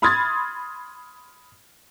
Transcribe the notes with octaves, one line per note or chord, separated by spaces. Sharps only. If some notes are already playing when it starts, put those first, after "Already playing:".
B5 C6 D#6 F6 G#6 A6